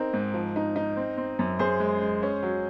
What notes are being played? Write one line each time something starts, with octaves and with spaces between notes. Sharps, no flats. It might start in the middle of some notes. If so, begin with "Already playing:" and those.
Already playing: C4 D#4 A#4
G#2
F3
D#4
D#4
C4
C4
F#2
F#2 G#4 C5
G#3
G#3
C#4
F#3